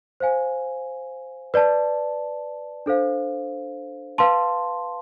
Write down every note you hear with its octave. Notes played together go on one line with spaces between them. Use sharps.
C5 F5 G#5
B4 D5 A5
D4 A4 C5 F5
B4 F5 A5 C6